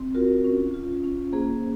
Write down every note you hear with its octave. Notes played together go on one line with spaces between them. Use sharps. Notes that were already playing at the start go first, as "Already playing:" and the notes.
Already playing: C4
F4 F#4 A#4
C#4
F4
C#4
A#3 G#4 C5